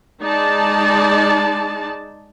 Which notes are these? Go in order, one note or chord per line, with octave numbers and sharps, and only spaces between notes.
G#3 D#4 D5 A5